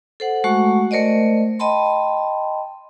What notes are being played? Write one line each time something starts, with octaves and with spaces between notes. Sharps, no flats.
A4 C5 F#5
G#3 A3 F#4 F#5 C#6
A3 A#4 C5 D5 D#5
D#5 G5 A5 B5 C6